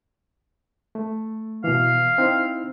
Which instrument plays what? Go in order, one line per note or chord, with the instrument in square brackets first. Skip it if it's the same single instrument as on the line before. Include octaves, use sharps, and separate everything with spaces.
[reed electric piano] A3
[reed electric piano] B2 E3 [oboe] F5
[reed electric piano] C4 D#4 E4